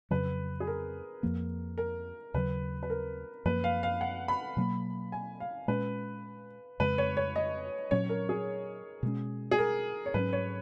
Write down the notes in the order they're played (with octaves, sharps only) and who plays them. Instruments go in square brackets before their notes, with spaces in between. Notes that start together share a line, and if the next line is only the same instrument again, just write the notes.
[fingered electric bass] F2 C#3 F#3 [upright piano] B4
[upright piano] G#4
A#4
[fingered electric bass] F2 F3 A#3
[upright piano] A#4
[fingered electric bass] D#2 C#3 F#3 [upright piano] B4
[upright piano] B4
A#4
[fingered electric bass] F#2 F3 A#3 [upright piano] B4
[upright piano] F5
F5
F#5
B5
[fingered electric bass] B2 F#3 A#3
[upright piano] G#5
F5
[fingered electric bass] A#2 G#3 C#4 [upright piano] B4
[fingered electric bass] F2 C#3 G#3 [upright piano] B4
[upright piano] C#5
C#5
D#5
[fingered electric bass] A#2 F#3 C#4 [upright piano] C#5
[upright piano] A#4
G#4
[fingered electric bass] B2 G#3 C#4
[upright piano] G#4
A#4
C#5
[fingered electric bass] G#2 F#3 C#4 [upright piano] B4
[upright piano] C#5